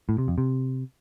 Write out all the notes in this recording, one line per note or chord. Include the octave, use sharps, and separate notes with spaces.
A2
C3
F2
C3